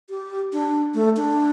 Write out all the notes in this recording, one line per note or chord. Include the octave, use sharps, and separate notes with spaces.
G4
D4
A3
D4